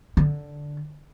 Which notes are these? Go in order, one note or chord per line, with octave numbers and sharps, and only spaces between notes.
D3